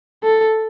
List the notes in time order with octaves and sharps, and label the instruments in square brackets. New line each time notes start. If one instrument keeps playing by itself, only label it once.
[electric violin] A4